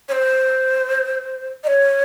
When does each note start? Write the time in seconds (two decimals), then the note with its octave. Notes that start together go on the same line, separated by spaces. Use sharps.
0.09 C#5
0.12 C5
1.64 D#5
1.67 C#5